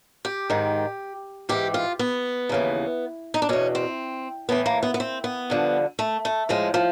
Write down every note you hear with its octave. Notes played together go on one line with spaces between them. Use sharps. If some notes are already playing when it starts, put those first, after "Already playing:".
G4
G#2 D#3
G#2 E3 G4
F4
B3
D#2 C#3 E3
D#4
D4
E2 B2 C#4
C4
A2 E3 B3
A#3
B3
B3
C4
B3
G2 D3 F3
A3
A3
A2 F3 G#3
F3